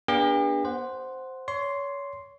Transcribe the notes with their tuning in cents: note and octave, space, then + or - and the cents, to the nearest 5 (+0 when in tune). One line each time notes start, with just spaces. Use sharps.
B3 -35 D4 -15 G4 +45
C5 +0 F#5 +0
C#5 +25 C6 +0